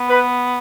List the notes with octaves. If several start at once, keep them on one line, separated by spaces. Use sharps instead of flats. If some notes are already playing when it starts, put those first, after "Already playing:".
Already playing: B3
B4